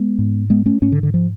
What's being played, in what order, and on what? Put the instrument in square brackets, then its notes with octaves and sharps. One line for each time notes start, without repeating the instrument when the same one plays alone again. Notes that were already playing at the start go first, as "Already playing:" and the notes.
Already playing: [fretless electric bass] G#3 B3
G#2
G#3 B3
A3 C#4
G#2 A3 C#4
D3
D3
F3